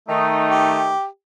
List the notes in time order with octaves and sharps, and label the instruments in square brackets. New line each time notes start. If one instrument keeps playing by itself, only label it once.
[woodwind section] D#3 A3 D#4
[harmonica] G4